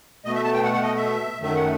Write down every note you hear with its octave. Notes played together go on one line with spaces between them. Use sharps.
B2 A3 D#5
E5
A5
G5
F#5
F#5
D#5
E5
F#2 D#3 A3 E5
F#5